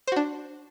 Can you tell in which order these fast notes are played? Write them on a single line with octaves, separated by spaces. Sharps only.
C5 F#4 D4